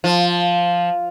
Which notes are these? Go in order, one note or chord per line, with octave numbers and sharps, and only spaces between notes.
F3